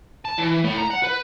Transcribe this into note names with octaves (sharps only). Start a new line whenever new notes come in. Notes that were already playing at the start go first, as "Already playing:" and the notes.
A5
E3
A2
A#5
F#5
B4